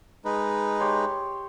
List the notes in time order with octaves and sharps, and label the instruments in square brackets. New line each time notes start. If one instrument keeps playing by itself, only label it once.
[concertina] G#3 D#4 B4
[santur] G4 C#5 C6